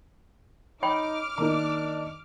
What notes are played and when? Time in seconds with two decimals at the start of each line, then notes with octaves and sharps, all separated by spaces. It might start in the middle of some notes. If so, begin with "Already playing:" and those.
0.83 D#4 C#5 G5 B5 D6 F6
1.38 D#3 A#3 D4 D#4 A#5